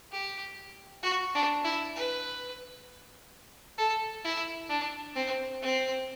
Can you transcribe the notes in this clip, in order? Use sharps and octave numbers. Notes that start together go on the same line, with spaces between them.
G4
F#4
D4
E4
B4
A4
E4
D4
C4
C4